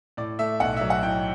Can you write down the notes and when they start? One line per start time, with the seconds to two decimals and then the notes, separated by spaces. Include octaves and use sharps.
0.17 A2 D5
0.39 A3 E5
0.60 B1 F#5
0.77 F#3 E5
0.90 F#5
1.03 A2 G5